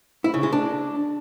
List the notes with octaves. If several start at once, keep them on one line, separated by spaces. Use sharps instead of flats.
E4
C#3
G#3
D4